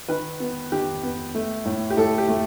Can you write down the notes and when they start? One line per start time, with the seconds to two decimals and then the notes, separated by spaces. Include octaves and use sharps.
0.08 D#3 B4
0.40 B3
0.72 D#3 G4
1.03 B3
1.35 A3
1.65 A2
1.90 G4
1.97 A2 A4
2.18 G4
2.28 A3